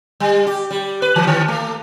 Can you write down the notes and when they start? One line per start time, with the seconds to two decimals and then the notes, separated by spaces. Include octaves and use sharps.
0.20 G3
0.46 G4
0.71 G3
1.02 B4
1.16 E3
1.27 D#3
1.48 A3